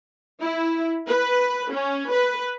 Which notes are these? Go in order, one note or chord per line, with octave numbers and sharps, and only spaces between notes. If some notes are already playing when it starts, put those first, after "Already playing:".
E4
B4
C#4
B4